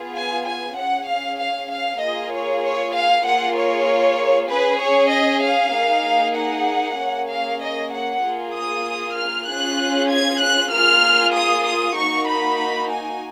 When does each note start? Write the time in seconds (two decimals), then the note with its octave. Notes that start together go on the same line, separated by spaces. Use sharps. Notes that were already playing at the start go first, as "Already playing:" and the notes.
Already playing: B3 F4 G#4
0.15 G#5
0.46 G#5
0.76 C#4 G#4 F#5
1.08 F5
1.39 F5
1.70 F5
2.00 A#3 F4 G#4 D#5
2.32 C#5
2.63 C#5
2.94 F5
3.26 A#3 F4 G#4 F#5
3.56 C#5
4.50 C#4 G#4 B4
4.81 C#5
5.12 D#5
5.42 F5
5.74 A#3 D#4 G#4
6.36 F#5
6.99 A#3 C#4 G#4
7.29 F5
7.61 D#5
7.92 F#5
8.23 A#3 F4 G#4
8.54 D#6
9.16 F6
9.47 C#4 F4 G#4 F#6
10.10 G#6
10.41 F#6
10.71 A#3 F4 G#4 F6
11.34 D#6
11.65 D#6
11.96 A#3 D#4 F#4 C#6
12.27 B5
12.89 G#5